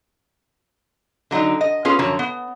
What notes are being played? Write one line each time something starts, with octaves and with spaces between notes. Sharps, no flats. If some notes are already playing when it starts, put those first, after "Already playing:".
D3 F#3 D4 D#4
D#5
B3 C#4 F4 G#4 A4
F#2 D3 F3 F#4 C#5 A5
B3